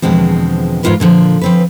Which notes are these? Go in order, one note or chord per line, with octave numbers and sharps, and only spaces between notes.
E2 B2 D3 F3 G#3 C4
E2 G#2 B2 F4 A#4 B4
A#2 D3 F3
F3 C4 B4